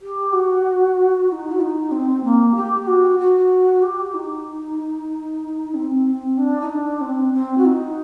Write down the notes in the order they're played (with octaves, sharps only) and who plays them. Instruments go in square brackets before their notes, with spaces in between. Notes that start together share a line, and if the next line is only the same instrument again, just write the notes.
[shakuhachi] G4
F#4
F#4
D#4
F#4
D#4
C4
A#3
G4
F#4
F#4
G4
D#4
C4
C4
D4
D#4
D4
C4
C4
F#4
D#4